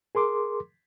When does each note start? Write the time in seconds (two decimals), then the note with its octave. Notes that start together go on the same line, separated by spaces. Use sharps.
0.15 G#4 A#4 C6 D6